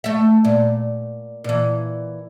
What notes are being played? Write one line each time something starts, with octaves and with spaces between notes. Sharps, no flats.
A3 E5
A#2
A#2 E3